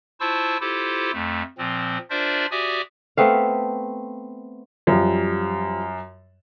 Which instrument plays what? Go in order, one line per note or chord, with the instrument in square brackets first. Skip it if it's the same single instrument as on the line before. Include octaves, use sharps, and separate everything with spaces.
[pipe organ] E4 F4 C5 A5 C#6 E6
E4 F4 G4 A4 C5
F2 A3
A#2 F3 C4
D4 F4 A#4 C5 D5 E5
F#4 G4 D5 E5 G#5 D#6
[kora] A3 B3 C4 F5
[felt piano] F#2 [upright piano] F3 G3